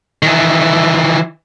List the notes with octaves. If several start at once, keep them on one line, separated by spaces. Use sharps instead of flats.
D#3 E3